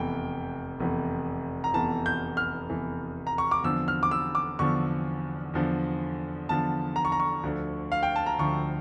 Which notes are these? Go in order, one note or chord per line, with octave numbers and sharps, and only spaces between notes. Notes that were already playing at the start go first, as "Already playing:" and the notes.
Already playing: F1 E2 E3 G5
F1 E2 E3
A#5
F1 E2 E3 A5
G6
F6
F1 E2 E3
A#5
C#6
D6
E2 D3 F3 E6
F6
D6
E6
D6
E2 D3 F3 C#6
E2 D3 F3
E2 D3 F3 A5
A#5
C#6
A#5
C#6
D2 D3 F3
F5
G5
A5
A#5
D2 D3 F3 C#6